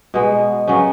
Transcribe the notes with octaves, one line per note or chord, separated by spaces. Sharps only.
B2 G#3 B3
C#3 F#3 B3 C#4